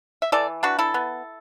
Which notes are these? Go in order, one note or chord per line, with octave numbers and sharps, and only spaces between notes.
E5
E3 A4 D5
D4 F#4 B4
E4 A4
B3